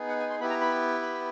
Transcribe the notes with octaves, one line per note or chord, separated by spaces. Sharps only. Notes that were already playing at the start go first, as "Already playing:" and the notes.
Already playing: B3 D#4 G#4
F#5
G#5
C6
B3 E4 G4 B5
A#5
B5
B5